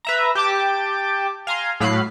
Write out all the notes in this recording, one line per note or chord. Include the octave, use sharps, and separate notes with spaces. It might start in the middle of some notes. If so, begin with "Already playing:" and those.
B4 E5 A#5
G4 G5 A5 D6
F5 G#5 A#5 C6
A2 F#3 F5 B5 F#6 C7